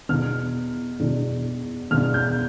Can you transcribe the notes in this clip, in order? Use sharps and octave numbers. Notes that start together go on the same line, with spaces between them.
E2 B2 B3 D4 F6
E2 B2 B3 D4
E2 B2 B3 D4 F6
G6